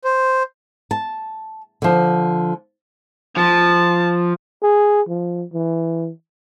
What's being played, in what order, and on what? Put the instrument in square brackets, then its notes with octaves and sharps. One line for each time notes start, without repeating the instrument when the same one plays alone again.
[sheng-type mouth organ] C5
[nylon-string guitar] A5
D3 F3
[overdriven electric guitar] F3 [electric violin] A5
[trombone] G#4
F3
E3